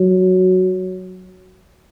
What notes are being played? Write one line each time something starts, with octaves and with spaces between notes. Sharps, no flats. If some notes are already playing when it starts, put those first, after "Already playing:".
Already playing: F#3